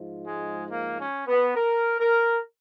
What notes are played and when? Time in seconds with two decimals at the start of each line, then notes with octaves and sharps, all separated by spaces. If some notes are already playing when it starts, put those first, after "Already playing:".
Already playing: G#2 F3
0.26 G#3
0.70 A#3
0.98 C#4
1.28 B3
1.56 A#4
2.00 A#4